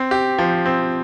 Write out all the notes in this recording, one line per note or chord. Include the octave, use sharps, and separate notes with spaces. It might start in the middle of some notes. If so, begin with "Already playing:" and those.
Already playing: C4
G4
F3
C4